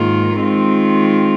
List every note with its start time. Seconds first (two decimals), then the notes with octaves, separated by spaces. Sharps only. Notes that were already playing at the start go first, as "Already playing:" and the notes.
Already playing: G#2 D#3 A#3 F4
0.36 D#3 G#3 C4 F4